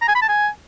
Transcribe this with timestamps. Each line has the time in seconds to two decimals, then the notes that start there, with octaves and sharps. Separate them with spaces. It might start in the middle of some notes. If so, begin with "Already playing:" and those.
0.01 A#5
0.08 G#5
0.15 B5
0.22 A5
0.29 G#5